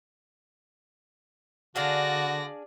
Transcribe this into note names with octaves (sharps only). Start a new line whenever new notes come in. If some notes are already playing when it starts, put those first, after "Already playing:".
D3 D4 F#4 G#4 D5 F5 A#6